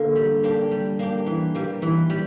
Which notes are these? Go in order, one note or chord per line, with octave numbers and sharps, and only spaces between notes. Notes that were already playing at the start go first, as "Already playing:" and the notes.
Already playing: D3 A#3
G3
A#3 D4 G4
G3
A#3 D4 G4
E3
G3 A#3
E3
G3